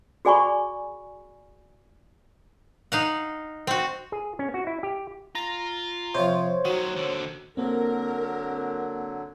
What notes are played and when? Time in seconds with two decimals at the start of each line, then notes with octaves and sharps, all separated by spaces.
0.25 F#4 G#4 D5 G#5 B5 C#6
2.92 D#4 F5 F#5
3.67 C4 F#4
4.12 G#4
4.39 C#4
4.54 F#4
4.67 E4
4.83 G4
5.35 F4 A#5
6.15 C3 F3 C5 C#5
6.65 D#3 F#3 F#4
6.96 D#2 D3
7.57 D3 F#3 A#3 C4 A#4